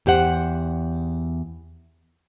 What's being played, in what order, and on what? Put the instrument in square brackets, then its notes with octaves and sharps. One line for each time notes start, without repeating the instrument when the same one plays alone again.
[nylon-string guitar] E2 G4 C5 F#5